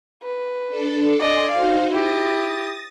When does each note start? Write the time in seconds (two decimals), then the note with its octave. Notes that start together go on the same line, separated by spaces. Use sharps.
0.23 B4
0.69 D4 A4
1.20 D5 D#5 G#5 C6
1.52 D#4 F#4 C5 F5
1.93 E4 G4 D#6 A6 A#6